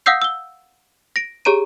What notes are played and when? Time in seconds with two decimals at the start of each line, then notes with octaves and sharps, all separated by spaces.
0.06 F5 F#5 D#6 E6 G6 C7
0.22 E6 G7
1.16 A#6 D7
1.45 G4 G#4 C#5 A#5 D7 D#7